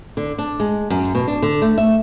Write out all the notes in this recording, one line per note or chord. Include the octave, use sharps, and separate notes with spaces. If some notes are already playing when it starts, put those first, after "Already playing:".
D3
D4
G#3
F#2
B2
D4
D3
A3
E5